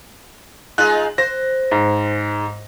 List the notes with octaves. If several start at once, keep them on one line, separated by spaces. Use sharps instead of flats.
G#3 D#4 F4 F#6
C5 A#6
G#2